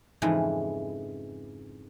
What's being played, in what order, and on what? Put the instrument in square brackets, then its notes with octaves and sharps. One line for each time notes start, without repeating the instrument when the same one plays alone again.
[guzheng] F2 G#2 C#3 E3